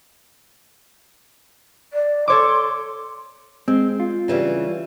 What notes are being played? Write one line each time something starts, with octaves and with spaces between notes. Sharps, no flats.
D5
A4 C#5 C6 D6
G#3 C4
F4
C#3 E3 G3